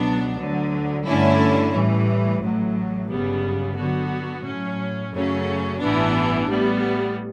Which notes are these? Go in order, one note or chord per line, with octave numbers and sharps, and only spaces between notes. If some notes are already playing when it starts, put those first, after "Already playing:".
Already playing: C#2 B2 F#3 B3 D4
D2 D3 F#3
G2 D3 A3 C#4 E4
A2 E3 G3
A1 A2 F#3
G1 F#2 C#3 G3 B3
D3 F#3 B3 F#4
A2 F#3 C#4
F#2 C#3 F#3 A3 C#4
A1 G2 E3 B3 D4
A2 G3 B3